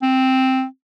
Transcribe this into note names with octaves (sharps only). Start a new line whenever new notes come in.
C4